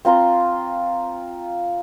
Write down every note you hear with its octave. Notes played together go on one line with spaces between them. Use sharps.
C4 F4 A#5 C6